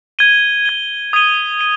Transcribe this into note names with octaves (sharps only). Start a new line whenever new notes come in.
G#6 D#7 G7
G#6 D#7 G7
D#6 G#6 D#7 G7
D#7 G7